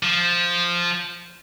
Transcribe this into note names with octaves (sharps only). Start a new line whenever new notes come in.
F3